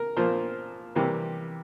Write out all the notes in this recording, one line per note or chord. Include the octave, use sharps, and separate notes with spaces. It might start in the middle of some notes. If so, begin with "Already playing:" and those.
Already playing: A#4
A#2 F3 A#3 C5
C3 E3 G3 A#3